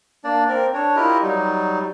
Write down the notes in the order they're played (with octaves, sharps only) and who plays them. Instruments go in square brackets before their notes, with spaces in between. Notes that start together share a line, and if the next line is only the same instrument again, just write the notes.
[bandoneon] A#3 D4 D5
C4 A#4
D4 C#5
E4 F4 G4 A#4 D#5
F#3 G3 D#4